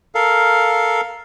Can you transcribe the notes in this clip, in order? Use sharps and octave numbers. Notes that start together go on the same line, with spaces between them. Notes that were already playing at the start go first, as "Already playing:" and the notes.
A4 A#4 F5